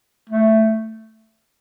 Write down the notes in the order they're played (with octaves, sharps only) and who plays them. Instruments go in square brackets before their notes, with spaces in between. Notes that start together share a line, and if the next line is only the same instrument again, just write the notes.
[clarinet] A3